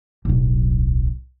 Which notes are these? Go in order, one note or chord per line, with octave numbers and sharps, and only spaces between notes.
D1 B1